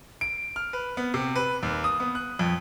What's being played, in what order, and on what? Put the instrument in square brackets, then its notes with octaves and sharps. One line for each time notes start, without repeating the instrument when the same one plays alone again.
[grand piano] D7
F6
B4
B3
C3
B4
D#2
D#6
B3
F#6
F2